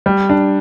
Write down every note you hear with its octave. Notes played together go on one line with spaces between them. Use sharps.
G3
D4